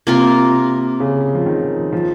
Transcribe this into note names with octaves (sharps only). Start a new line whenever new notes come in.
C3 A#3 F4 A#4
C#3
F3
D#3
F3